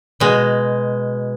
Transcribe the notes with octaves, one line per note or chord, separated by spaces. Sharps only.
B2 G#3